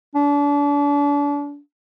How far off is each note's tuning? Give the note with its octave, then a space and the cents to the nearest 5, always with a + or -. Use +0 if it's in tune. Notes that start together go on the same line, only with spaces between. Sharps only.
D4 -35